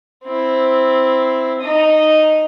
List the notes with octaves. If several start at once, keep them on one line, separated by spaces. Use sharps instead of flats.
C4 E4
D#4 D#5